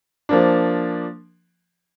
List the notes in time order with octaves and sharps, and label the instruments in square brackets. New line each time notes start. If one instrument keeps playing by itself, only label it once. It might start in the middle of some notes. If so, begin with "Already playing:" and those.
[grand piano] F3 A#3 D4